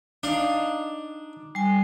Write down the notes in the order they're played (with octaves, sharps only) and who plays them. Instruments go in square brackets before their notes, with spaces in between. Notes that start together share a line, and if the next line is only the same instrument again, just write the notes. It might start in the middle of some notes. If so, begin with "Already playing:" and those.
[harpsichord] D4 [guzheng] D#4 F5
[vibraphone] G3 G#5